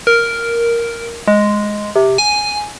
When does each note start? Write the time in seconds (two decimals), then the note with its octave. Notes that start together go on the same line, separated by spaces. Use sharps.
0.07 A#4
1.28 G#3
1.96 C3
2.18 G#5